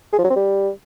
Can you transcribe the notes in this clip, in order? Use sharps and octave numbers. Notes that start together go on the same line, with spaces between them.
G#4
F3
F#3
C4
G3